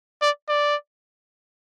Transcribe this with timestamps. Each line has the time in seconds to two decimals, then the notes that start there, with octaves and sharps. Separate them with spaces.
0.22 D5
0.49 D5